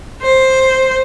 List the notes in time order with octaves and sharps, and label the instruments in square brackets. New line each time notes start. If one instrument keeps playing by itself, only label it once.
[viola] C5